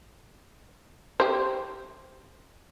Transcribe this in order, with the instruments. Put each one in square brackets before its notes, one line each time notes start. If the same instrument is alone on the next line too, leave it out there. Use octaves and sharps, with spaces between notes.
[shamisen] G4 C5